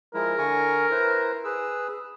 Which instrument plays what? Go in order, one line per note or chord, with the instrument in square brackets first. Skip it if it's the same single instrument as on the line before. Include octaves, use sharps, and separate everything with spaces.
[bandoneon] F3 G#3 E4 [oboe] A#4
[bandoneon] D3 G#5 C#6
E4 B4 C5
G#4 B4 E6